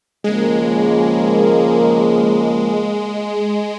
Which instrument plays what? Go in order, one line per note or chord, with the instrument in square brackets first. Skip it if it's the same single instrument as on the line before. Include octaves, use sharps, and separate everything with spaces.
[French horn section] D#2 C#3 F3 A#3 [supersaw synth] G#3